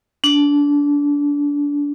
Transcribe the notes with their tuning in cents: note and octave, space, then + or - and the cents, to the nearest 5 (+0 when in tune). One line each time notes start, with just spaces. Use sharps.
D4 -25